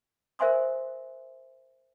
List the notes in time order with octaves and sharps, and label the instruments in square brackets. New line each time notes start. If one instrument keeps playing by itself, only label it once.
[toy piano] A#4 C5 E5 G#5 C6 D#6